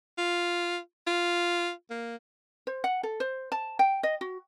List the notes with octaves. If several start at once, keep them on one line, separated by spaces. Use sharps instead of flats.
F4
F4
A#3
C5
F#5
A4
C5
A5
G5
D#5
F#4